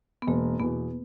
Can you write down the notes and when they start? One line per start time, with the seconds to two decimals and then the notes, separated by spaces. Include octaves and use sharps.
0.22 B3
0.27 E1 A#3
0.60 E2 B2 B3